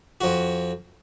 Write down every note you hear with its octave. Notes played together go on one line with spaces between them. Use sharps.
F2 F#4